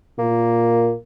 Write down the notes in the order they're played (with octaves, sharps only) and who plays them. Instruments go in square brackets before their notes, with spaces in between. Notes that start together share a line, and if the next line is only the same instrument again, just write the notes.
[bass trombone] A#2 [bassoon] A#3